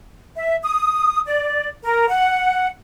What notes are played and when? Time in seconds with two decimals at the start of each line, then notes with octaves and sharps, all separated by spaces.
0.36 E5
0.63 D#6
1.26 D5
1.84 A#4
2.08 F#5